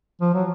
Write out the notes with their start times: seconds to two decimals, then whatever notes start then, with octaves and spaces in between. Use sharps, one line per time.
0.21 F3
0.34 F#3